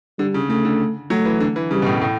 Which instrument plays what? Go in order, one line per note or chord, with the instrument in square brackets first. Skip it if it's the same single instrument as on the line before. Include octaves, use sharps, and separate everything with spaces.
[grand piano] D3 [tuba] G3
[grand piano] C#3
[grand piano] C#3 [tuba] A3
[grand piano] D3
[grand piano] F#3 [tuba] A3
[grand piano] E3
D3
E3
[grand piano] C#3 [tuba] G3
[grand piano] B2
A2
A2